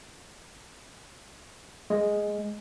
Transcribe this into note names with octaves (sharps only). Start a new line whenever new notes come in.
G#3